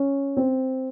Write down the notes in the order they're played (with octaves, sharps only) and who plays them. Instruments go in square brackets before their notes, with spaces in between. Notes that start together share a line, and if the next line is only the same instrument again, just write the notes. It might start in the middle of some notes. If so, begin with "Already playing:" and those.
Already playing: [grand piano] C#4
C4